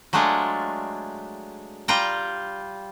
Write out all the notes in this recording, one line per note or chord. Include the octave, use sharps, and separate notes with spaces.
F#3 G#3 A3 D4 F4
G3 F4 G5 A#5